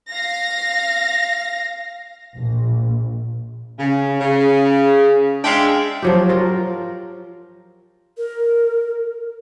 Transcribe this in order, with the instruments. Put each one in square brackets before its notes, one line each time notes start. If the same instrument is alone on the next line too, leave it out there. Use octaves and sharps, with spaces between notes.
[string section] F5 A#6
[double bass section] A#1
[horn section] C#3
C#3
G#3 D4 E5 F5 G5
[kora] F3 F#3 G4
F4 A#4
[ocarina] A#4